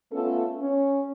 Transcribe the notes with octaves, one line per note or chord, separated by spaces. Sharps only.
A3 B3 C#4 F4 A4
C#4